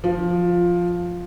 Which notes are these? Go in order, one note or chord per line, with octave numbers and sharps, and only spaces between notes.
F3